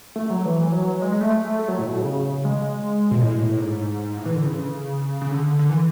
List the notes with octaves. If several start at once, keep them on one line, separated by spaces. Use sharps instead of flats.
A3
F#3
E3
F#3
G#3
G#3
A3
A3
F#3
A2
B2
C#3
G#3
B2
A2
G#2
A2
E3
D3
C#3
C#3
D3
D3
E3